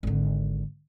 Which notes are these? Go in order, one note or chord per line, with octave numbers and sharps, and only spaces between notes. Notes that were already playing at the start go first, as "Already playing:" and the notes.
G#1 D3